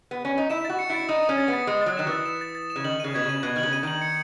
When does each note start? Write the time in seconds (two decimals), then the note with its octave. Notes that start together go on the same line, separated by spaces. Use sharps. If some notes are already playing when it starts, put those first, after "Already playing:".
0.11 B3
0.25 C#4
0.38 D#4
0.50 E4 E7
0.65 F#4 A6
0.79 C#7
0.90 E4 A6
1.09 D#4 D#6
1.23 D#6
1.29 C#4
1.37 A6
1.48 B3 A6
1.67 G#3 D#6
1.81 F#3 A6
1.97 D#3 E7
2.07 E3 A6
2.25 E7
2.41 A6
2.55 A6
2.70 E7
2.76 C#3
2.84 D#3 F#7
3.00 C#3 D#7
3.14 B2 G#6
3.24 C#3
3.29 D#7
3.43 B2 D#7
3.56 D#3
3.58 C#3 F#7
3.73 D#7
3.83 D#3 F#7
4.01 C#7